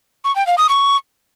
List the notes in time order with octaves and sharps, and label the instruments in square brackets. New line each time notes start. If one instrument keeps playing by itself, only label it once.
[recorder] C#6
G5
F5
D#6
C#6